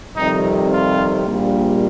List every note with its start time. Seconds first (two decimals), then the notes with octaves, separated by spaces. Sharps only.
0.16 F2 C3 D#3 G3 D#4
0.71 F4
1.26 A#1 A#2 G3